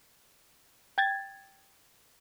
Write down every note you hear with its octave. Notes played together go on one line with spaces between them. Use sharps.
G5 G#6 A6